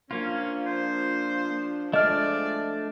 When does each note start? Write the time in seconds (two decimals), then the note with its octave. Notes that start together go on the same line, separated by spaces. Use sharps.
0.11 F3 A#3 C#4 D4 F4
0.66 C5
1.93 F3 G#3 A3 D4 D5 D#5 F6